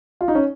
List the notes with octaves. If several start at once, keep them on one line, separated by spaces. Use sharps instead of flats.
F4
D#4
C#4